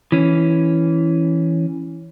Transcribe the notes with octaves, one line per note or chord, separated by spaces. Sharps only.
E3 C#4